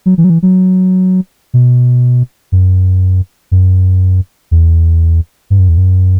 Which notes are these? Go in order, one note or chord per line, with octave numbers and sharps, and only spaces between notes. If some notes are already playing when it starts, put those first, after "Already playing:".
F#3
E3
F#3
E3
F#3
B2
F#2
F#2
E2
G2
F#2
E2
F#2